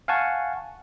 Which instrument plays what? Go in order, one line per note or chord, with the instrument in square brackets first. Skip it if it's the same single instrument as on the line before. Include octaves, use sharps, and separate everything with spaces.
[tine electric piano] F5 F#5 G#5 A5 C#6